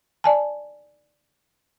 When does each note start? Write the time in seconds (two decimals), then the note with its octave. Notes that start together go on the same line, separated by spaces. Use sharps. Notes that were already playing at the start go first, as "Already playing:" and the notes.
0.24 D5 G#5 A5